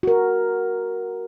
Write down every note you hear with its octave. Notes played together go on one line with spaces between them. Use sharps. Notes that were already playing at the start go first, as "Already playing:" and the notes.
F#4 A#4